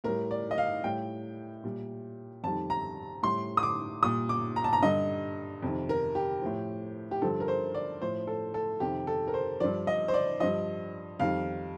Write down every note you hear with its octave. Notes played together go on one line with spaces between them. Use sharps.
A2 G3 A#4
D5
D#5
F5
A2 G3 G5
A#2 G3
F2 D#3 G3 A5
A#5
A2 G3 C6
D#6
D6
A#2 G3 D#6
D6
A#5
A5
A#5
G2 D3 G3 D#5
F2 C3 D#3
A#4
G4
A2 F3
G4
G2 D3 F3 A4
A#4
C5
D5
A2 F3 C5
A4
A4
F2 C3 D#3 G4
A4
A#4
C5
G2 F3 D5
D#5
C5
D5
G2 F3 D#5
F2 D#3 G3 F5